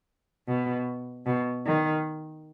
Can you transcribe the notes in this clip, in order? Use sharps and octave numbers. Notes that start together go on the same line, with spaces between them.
B2
B2
D#3